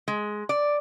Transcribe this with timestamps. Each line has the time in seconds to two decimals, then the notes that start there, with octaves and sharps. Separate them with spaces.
0.08 G#3
0.49 D5